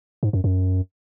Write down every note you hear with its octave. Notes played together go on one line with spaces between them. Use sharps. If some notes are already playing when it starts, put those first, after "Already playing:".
G#2
F#2
F#2